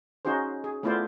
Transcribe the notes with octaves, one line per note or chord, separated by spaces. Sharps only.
C#4 D#4 F#4 G#4 C5
G#4
A3 B3 E4 F4 C5 D5